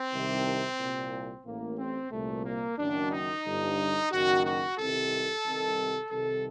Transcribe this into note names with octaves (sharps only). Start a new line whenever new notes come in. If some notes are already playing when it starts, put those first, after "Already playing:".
Already playing: C4
C2 C3 D#3
C2 A#2
A1 A2 A#3
C4
C2 A#2 A3
A#3
F#1 F#2 D#3 D4
D#4
G1 G2 D3
F#1 F#2 D#3 F#4
F#4
C2 C3 D#3 A4
C2 C3 D#3
C2 C3 D#3 A4